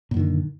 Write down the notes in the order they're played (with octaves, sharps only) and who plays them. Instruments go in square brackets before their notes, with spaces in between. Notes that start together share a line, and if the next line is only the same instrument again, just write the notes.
[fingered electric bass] A#2
F#2
D#3
D3